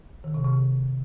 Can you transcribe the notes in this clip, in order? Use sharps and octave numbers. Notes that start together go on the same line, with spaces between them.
D#3
C3
C3